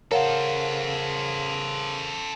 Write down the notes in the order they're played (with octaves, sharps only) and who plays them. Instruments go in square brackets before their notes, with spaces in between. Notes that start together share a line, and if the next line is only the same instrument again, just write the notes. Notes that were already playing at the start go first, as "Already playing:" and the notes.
[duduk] C#3 [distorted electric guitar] A4 C5 [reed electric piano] A#4 [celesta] C#5 F5 F#5